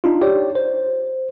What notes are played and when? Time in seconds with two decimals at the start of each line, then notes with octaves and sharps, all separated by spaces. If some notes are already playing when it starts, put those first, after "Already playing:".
0.04 D4 D#4 F4
0.21 G4 C#5 D5
0.55 C5